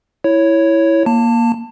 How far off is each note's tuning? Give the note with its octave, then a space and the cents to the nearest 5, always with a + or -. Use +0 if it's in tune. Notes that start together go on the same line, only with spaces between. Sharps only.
E4 +0 C#5 +0
A#3 +10 A5 +20